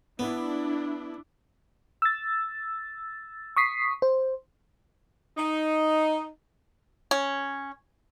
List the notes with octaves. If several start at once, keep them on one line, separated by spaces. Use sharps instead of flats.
B3 D4 E4
E6 A6
C#6 D#6 B6 C7
C5
D#4
C#4